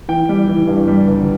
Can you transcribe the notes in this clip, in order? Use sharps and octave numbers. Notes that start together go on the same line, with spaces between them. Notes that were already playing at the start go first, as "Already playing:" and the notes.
E3 G5
G3
E3
G2
G3
G1